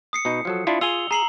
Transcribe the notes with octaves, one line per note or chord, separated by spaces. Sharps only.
D#6 C7 C#7
B2 D#4
F3 F#3 A4
D4 E4 F4
F4 G#4 G#5 E6 F7 G7
G#4 A#5 C7 F#7